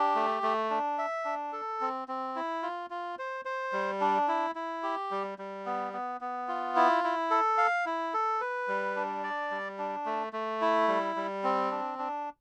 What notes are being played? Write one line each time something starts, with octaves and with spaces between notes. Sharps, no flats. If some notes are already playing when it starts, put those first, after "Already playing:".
Already playing: D4 G4
A3
A3
D4
E5
D4
A4
C4
C4
E4
F4
F4
C5
C5
G3
D4
E4
E4
G4
G3
G3
B3
B3
B3
F4
E4
E4
A4
F5
E4
A4
B4
G3
D4
D5
G3
D4
A3
A3
E4
G3
G3
C4
D4
D4